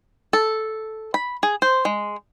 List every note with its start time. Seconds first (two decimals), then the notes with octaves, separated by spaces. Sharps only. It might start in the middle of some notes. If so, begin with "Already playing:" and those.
0.33 A4
1.14 B5
1.43 G#4
1.62 C5
1.85 G#3